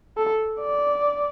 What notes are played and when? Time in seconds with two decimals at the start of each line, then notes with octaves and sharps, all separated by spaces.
0.17 A4
0.61 D5